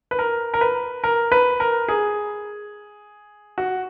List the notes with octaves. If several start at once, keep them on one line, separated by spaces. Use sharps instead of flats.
B4
A#4
A#4
B4
A#4
B4
A#4
G#4
F#4